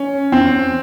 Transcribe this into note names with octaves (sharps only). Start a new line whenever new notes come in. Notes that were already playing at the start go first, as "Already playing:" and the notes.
Already playing: C#4
C4